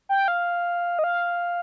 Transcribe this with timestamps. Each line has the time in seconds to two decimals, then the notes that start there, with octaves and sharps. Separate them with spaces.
0.09 G5
0.28 F5
0.99 D#5
1.04 F5